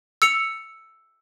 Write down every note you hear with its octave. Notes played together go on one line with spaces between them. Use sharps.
E6 C#7 F7